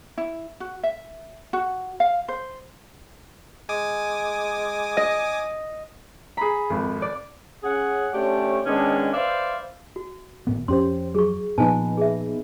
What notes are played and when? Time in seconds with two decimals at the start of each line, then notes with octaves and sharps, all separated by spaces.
0.18 E4
0.60 F#4
0.83 E5
1.53 F#4
2.00 F5
2.28 C5
3.69 G#3 G#5 D6 D#6
4.97 D#5
6.37 G#4 A#5 B5
6.70 G#1 F2
7.02 D5
7.63 C#4 G#4 F#5
8.14 A3 C#4 D4 G4 C5 C#5
8.66 D#3 G#3 B3 C#4 D4
9.14 B4 C5 D5 E5 F5
9.96 F#4
10.47 G#1 A2 B3
10.68 F2 C#4 G4 C5 C6
11.15 F#3 G#4 C#6
11.58 A#2 F3 B3 D#4 B4 C5 G#5 A5
11.97 G#4 E5